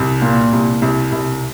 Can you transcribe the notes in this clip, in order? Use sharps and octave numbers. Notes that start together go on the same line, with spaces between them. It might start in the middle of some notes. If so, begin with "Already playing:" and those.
Already playing: C2
A#2
C2
C2
C2